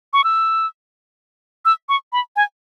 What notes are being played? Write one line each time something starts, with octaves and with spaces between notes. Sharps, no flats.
C#6
E6
E6
C#6
B5
G#5